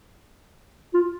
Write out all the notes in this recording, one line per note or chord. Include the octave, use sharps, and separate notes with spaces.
F4